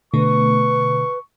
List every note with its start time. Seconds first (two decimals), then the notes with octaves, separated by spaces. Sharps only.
0.14 B2 D3 A3 B4 C#6